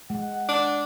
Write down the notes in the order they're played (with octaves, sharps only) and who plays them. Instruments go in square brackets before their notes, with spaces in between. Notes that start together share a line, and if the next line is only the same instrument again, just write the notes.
[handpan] G#3 [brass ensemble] F#5
[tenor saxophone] D4